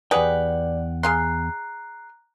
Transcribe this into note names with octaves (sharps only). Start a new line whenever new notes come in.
E2 G4 G#4 B4 D5 F#5 G5
G#4 F5 A#5 C6 F#6 C7